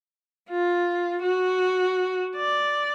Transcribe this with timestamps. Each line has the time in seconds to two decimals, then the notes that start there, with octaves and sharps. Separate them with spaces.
0.50 F4
1.22 F#4
2.36 D5